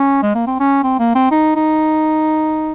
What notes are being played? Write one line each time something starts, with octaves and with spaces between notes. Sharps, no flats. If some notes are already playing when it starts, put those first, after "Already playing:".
Already playing: C#4
G#3
A#3
C4
C#4
C4
A#3
C4
D#4
D#4